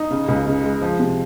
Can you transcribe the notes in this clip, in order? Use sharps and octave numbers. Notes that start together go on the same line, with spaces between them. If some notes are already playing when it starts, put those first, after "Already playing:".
Already playing: D#4
C#3
C#2
C#3
G#3
F3
C3